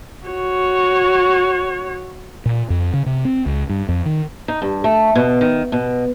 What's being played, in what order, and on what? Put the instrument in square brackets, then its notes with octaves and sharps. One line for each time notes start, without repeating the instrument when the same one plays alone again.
[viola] F#4 C#5
[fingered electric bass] A#2
F2
C#3
C3
C4
C#2
G2
F2
D#3
[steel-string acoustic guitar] D#4
G2
A3
B2
D#3
B2